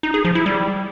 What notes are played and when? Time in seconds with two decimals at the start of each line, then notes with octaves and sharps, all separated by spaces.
0.03 D#4
0.14 G#4
0.25 F3
0.35 E4
0.46 G3